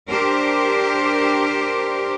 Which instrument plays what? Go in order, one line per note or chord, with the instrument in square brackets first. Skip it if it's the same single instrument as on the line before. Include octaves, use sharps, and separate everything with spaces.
[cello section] D4 G4 A#4 C5